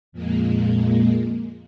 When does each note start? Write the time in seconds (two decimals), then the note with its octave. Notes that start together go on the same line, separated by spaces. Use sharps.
0.12 F2 A#2 G#3 A#3